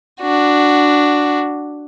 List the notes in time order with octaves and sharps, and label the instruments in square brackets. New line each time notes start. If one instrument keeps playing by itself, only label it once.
[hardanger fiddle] D4 F#4